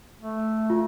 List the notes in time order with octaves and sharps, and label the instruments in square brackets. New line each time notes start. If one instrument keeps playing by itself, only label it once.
[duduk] A3
[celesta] F4